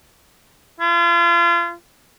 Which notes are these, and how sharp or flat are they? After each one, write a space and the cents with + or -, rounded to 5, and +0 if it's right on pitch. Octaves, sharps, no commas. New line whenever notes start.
F4 -35